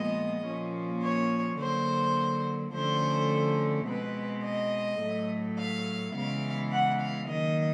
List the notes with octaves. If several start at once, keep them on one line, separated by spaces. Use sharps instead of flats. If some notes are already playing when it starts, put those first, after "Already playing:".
Already playing: A#2 F3 G#3 B3 D#5
A#2 F3 A#3 C#4
C#5
D3 F#3 A#3 C5
D3 F3 A3 C#4 C5
B2 G#3 C4 B4
D#5
A2 F#3 A3
F5
C#3 E3 G#3 B3 F5
F#5
F5
D#3 F#3 A#3 D#5